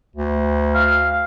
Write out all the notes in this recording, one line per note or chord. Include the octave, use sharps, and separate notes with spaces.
D2
F5